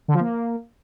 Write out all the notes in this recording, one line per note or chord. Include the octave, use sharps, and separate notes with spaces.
D3
F3
A#3